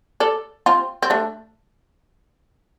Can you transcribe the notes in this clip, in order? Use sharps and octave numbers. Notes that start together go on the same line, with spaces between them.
A4 D5
C4 F4
C4
A3 D4